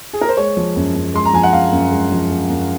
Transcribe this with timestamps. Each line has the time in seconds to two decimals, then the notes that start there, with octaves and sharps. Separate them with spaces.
0.13 G#4
0.21 A#4
0.29 C5
0.37 G#3 C#5
0.57 F3
0.76 F#2
0.95 F#2
1.14 G#3 C6
1.25 A#5
1.33 F3 G#5
1.43 F#5
1.53 F#2 F5
1.72 F#2
1.92 G#3
2.11 F3
2.30 F#2
2.50 F#2